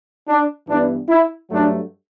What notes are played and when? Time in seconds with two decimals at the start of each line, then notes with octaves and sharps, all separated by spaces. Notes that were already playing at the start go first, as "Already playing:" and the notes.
0.28 D4
0.68 G2 E3 B3 D4
1.08 E4
1.50 G2 F#3 A3 D4